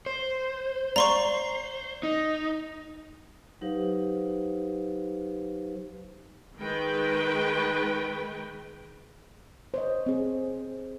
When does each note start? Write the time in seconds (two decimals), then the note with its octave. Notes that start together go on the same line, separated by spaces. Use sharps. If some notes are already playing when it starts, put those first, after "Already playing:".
0.06 C5
0.96 D5 F5 A#5 C6 C#6
2.03 D#4
3.61 F#3 D#4 G4 B4 C5 F5
6.60 D#3 G#3 B4 G5
9.74 C5 C#5 D#5
10.06 C4 G#4